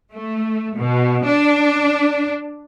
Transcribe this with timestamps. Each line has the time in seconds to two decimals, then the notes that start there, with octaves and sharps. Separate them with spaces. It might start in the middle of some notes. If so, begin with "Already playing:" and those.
0.13 A3
0.76 B2
1.26 D4